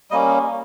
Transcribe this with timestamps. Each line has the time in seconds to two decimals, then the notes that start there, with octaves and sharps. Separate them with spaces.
0.11 G3 A#3 C#4 D#5